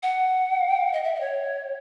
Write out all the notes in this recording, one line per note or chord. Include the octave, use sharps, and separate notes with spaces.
F#5
D#5
E5
D#5
C#5